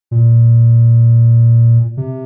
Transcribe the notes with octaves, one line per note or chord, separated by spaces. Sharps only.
A#2
C3